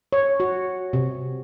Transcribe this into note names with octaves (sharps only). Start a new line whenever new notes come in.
C#5
F#4
C3